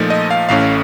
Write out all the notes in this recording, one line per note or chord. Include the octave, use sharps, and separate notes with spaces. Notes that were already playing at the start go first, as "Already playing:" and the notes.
Already playing: A#2 F3 A3 D#4
D#5
F5
A1 A2 A3 C#4 F5